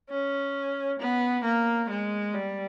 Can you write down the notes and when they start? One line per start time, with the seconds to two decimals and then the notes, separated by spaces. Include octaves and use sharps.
0.10 C#4
1.00 B3
1.45 A#3
1.90 G#3
2.34 G3